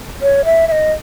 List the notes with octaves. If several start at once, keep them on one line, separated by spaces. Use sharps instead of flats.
C#5
E5
E5
D#5